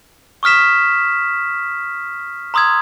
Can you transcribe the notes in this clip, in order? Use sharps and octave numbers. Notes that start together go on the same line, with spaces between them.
C#6 D#6 F6 B6 E7
A#5 C6 D#6 E6 G#6